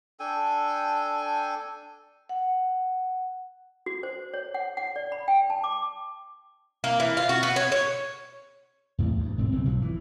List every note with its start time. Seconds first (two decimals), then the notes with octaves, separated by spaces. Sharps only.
0.20 D4 A4 G5 G#5
2.29 F#5
3.86 F#4
4.03 C5
4.34 C#5
4.54 F#5
4.77 F#5
4.96 D5
5.12 B5
5.28 G5
5.50 A5
5.64 D6
6.84 A#3
7.00 E3
7.17 F4
7.29 F#4
7.43 B3
7.56 C#5
7.72 C#5
8.99 E2 A2 C3
9.19 D2
9.38 E1 G#2 C4
9.52 B1 C#3 C4
9.66 B1 F3 F#3
9.82 E3